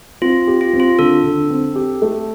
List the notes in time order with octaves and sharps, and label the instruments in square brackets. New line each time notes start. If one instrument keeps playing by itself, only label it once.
[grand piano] C4 [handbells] F4
[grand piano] G4
[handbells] F4
[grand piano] C4
[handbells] F4
[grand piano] D3 [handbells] A4
[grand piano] D3
C4
G4
A3